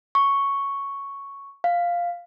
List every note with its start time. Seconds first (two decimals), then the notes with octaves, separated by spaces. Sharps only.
0.15 C#6
1.64 F5